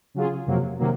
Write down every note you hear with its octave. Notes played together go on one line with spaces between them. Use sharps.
C#3 F#3 C#4 F4 G#4
F2 C3 F#3 A#3
C3 D#3 F#3 A#3